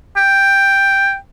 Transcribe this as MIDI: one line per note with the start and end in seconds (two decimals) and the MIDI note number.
0.17 1.16 79